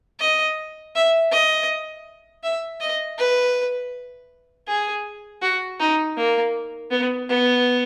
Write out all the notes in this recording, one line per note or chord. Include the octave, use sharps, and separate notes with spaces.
D#5
E5
D#5
E5
D#5
B4
G#4
F#4
D#4
A#3
B3
B3